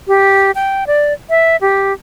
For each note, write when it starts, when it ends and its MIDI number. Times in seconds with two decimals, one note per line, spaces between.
0.08 0.51 67
0.55 0.84 79
0.87 1.13 74
1.30 1.56 76
1.61 1.93 67